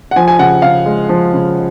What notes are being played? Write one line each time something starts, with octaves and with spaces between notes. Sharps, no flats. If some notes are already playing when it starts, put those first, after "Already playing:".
F#5
F3 G#5
G#5
C#3 F#5
C#3 F5
G#3
F3
C#3